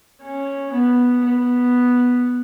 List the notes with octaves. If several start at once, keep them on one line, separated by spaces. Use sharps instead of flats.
C#4
B3
B3